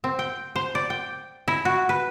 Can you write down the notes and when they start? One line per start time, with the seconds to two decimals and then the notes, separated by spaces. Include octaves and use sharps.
0.04 C4
0.19 G5
0.56 C5
0.75 D5
0.90 G5
1.48 E4
1.65 F#4
1.89 B4